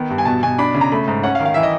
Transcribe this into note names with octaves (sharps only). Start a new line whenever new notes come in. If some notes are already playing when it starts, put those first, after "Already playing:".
Already playing: D#3 B3
G2
G#5
B2 A5
B2 G#5
D4 B5
C#3
A#5
A3 B5
G#2
C#4 F#5
F5
D#3
F5
E3 E5
D#5